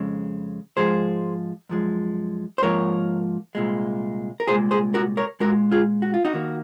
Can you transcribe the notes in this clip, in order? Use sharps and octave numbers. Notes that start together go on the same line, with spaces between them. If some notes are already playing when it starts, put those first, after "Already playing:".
Already playing: F2 C#3 G#3
G#2 F3 G#3 G#4 C5
F#2 F3 G#3
C5
G#2 F3 A#3 A#4 C#5
C2 A#2 G#3
A#4
C2 A#2 G#3 G#4 C5
G#4 C5
F#4 A#4
A#4 C#5
A#2 G#3 F#4 A#4
F4 G#4
F#4
F4
D#4 F#4
D#2 D#3 A#3